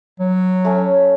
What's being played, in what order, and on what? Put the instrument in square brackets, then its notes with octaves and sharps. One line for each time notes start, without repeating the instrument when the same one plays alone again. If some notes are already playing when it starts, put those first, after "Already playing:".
[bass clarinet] F#3
[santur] A3 C#4